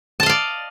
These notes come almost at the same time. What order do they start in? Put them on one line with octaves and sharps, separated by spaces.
A5 D#5 F5 D5